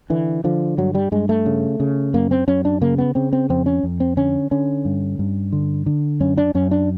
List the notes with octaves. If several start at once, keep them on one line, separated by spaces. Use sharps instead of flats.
D3 E3
D3 F3
G2 F#3
G3
G2 G#3
A3
C#3
C#3
F#2 A#3
C4
F#2 C#4
D4
C#3 A#3
B3
C#3 C4
C4
F2 C4
C#4
F2
C4
D3 C#4
D3 C#4
G2
G2
D3
D3
F#2 C#4
D4
F#2 C#4
D4